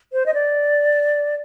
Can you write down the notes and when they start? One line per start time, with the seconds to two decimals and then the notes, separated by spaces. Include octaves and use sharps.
0.13 C5
0.26 D#5
0.34 D5